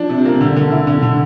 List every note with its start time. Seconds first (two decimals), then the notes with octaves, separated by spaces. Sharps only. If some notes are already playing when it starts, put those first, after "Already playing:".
Already playing: F3 D4
0.09 C3
0.25 A#3
0.41 D3
0.56 D3
0.72 E4
0.87 D3
1.03 D3